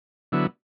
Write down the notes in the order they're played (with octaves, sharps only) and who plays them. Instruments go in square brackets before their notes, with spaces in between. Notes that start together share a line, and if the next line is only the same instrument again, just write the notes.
[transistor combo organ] D3 F#3 B3 E4